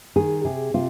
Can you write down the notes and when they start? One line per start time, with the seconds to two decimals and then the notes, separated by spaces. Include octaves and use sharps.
0.16 D#3 G#4
0.45 C3 G#4
0.74 C3 F4